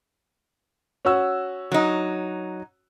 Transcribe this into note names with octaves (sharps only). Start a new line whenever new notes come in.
C#4 F#4 E6
F#3 D#4